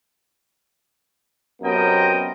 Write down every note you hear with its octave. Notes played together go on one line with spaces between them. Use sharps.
F#2 C3 B3 A#4 D#5 G5